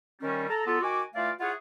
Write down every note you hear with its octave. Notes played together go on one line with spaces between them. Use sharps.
D#3 G3 C#4
A4 A#5
F#3 B3 F4 A4
D#3 F#4 G#5 D6
E3 A3 F4 D5 F5
E4 F4 G#4 C#5 F#5